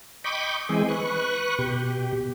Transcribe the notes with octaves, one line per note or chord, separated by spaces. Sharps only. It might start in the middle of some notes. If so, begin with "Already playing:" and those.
D#5 G5 B5 C#6 D6
E3 G#3 C4 G#4 D#5
B4 C#6 F#6
B2 G4